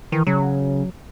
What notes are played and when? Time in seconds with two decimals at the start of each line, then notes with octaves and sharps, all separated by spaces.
0.12 D#3 E3
0.27 C#3 F#3